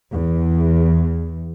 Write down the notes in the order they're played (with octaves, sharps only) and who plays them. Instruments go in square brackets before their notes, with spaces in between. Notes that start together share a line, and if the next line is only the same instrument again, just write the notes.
[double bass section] E2